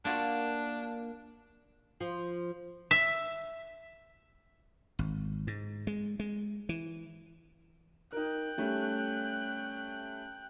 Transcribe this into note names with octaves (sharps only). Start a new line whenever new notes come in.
A#3 D4 F4 F#4
F3
E5
G#1
G#2
G#3
G#3
E3
D#4 A#4 G5 F#6
G3 A3 C#4